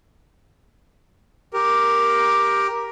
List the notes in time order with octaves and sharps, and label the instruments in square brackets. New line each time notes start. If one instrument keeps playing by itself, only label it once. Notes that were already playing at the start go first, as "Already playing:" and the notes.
[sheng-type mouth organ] G4 A#4